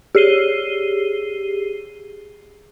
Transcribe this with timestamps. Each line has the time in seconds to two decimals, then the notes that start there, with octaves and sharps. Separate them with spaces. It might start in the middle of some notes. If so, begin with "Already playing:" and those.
0.15 G4 G#4 C7 D#7 G7